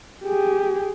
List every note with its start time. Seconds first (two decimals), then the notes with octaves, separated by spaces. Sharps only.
0.25 G4 G#4